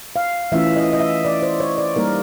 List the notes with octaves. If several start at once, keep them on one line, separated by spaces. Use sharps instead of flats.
F5
E3 A3 C#4 F4 E5
D#5
D#5
E5
D5
C5
C#5
D5
G3 A#3 D#4 A#4